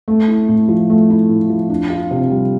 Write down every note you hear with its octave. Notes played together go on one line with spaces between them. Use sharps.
A3
E4
A2
F3
A3
E4
A2
F3
D4
F4
C3
G3